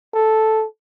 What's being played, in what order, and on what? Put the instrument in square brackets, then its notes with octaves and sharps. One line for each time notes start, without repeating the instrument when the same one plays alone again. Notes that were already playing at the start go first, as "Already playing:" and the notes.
[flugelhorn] A4